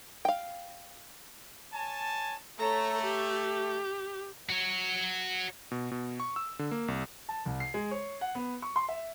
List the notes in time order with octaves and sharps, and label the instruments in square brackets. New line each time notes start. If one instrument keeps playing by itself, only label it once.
[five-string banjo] F5 G5
[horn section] C#5 G#5 A5
[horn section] A3 [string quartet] A4 C#5 A#5
[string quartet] G4
[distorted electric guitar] F#4 C#5
[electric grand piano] B2
B2
C#6
E6
D3
A#3
C2
[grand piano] A5
C2
C7
G#3
C#5
F#5
B3
C#6
C6
E5